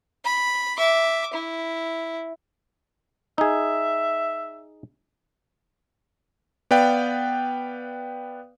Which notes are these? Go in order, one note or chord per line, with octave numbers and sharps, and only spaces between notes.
B5
E5 D6
E4
D#4 G#4 E5
B3 B4 D5 F5 G5